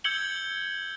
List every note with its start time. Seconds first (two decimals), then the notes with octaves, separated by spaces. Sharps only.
0.04 E6 G6 G#6 C#7 F#7 G7